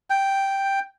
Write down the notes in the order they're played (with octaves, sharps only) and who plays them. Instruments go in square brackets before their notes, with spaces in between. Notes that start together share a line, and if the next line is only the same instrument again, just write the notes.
[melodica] G5